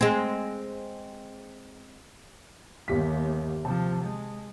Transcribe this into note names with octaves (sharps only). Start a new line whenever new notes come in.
G#3 C4
G1 D#2 G4 B6
C3 F3 A5
G#3